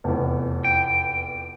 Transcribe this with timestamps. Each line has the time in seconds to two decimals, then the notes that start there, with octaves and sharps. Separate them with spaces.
0.04 F1 E2
0.64 G5